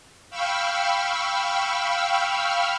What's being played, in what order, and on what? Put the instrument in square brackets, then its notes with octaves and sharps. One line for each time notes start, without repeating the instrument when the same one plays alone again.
[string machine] F5 G5 B5 C#6 E6 F6